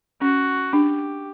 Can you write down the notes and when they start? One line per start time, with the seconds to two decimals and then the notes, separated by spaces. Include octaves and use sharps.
0.21 C#4 F#4
0.73 D4 G4